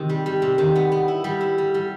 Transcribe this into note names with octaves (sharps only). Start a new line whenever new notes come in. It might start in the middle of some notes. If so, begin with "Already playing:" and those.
Already playing: C3 D#3
G3
G3
C3
D#3
B3
B3
E4
G3
E4
G3
G3